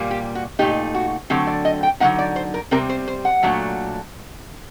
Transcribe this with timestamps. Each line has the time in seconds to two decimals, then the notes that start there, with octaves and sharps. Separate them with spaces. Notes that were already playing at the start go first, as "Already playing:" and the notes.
Already playing: A#2 G3 A#3
0.11 G4
0.35 F#4
0.59 A#2 A3 D#4 G4
0.94 F#4
1.30 D3 F#3 A3 C4 G4
1.47 D5
1.65 D#5
1.83 G5
2.00 D3 F#3 A#3 D#4 F#5
2.19 D5
2.36 C5
2.54 A#4
2.71 C3 G3 C4 A#4
2.89 C5
3.08 C5
3.25 F#5
3.43 A#2 F#3 A3 D4